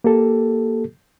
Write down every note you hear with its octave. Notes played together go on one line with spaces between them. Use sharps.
A#3 G4 A4